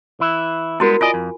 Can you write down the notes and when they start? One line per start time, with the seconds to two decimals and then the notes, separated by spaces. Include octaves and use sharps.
0.20 E3 E4
0.80 G3 G#3 B3 E4 F#4 A#4
1.01 F4 A#4 D5 D#5 G#5
1.14 F2